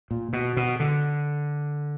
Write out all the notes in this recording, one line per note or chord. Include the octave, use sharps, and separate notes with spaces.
A#2
B2
B2
D3